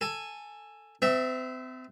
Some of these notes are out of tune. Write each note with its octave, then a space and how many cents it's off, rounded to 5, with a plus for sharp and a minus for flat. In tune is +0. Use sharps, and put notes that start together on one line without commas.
A4 +10 G#5 +0
C4 -40 E5 -5